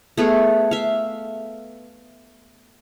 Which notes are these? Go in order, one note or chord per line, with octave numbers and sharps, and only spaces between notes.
A3 B3 G#4 F5
E5 F5